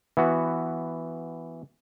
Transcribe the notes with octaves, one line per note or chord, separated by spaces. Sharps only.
E3 B3 F#4